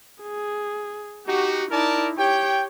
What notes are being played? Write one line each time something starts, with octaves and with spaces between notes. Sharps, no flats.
G#4
D#4 F#4 G4
D#4 E4 A#4 D5 A5
G4 C#5 G5